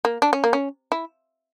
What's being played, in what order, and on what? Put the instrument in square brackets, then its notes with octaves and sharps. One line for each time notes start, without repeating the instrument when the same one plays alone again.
[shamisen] A#3
D4
C#4
A#3
C#4
E4